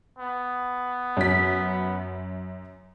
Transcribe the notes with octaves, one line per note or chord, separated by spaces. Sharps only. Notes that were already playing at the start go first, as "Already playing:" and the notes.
B3
F#2 B6